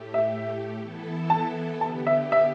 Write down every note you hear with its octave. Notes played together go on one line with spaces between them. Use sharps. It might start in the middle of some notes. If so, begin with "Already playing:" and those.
Already playing: A2 A3 G4
E5
E3 B3 E4 A4
A5
D3 B3 G4 A5
E5
E5